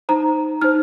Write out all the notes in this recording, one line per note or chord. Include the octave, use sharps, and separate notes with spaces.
D#4 C5 A#5
D#4 C5 F6